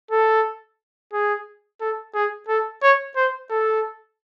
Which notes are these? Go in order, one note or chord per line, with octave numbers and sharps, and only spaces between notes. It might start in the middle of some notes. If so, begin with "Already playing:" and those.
A4
G#4
A4
G#4
A4
C#5
C5
A4